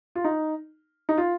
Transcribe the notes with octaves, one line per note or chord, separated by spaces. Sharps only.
F4
D#4
D#4
F4